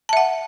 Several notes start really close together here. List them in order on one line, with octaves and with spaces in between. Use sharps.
A5 E5 F#5